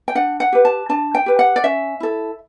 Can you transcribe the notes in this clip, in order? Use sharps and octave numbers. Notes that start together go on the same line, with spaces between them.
G5
D4 F#5
F#5
G4 B4
A5
D4 A5
G5
G4 B4
F#5
D5
C#4 E5
E4 A4